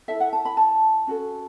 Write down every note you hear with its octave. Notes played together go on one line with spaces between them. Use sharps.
E4 A4 E5
F#5
A5
B5
A5
C#4 F#4 A4